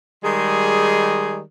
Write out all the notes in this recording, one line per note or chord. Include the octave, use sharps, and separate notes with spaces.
D#3 G3 G#3 G#4